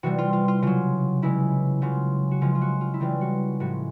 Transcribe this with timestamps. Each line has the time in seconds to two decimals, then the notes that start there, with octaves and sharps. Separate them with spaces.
0.03 C3 E3 G3 F#4
0.18 F4
0.33 F4
0.48 F4
0.62 C#3 F#3 F4
1.22 C#3 E3 G#3 E4
1.82 C#3 F#3 F4
2.31 F#4
2.41 C#3 F3 G#3 F4
2.55 F4
2.61 F#4
2.81 F4
2.94 E4
3.00 C#3 E3 G3 F4
3.21 F#4
3.60 A2 F3 G#3 F#4